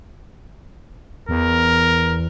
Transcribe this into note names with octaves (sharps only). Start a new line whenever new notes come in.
E2 A#4